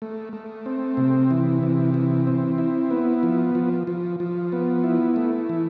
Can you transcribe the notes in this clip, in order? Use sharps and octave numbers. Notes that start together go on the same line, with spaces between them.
A3
A3
C4
C3
E3
C3
E3
C4
E4
B3
F3
F3
F3
F3
B3
E4
A3
E3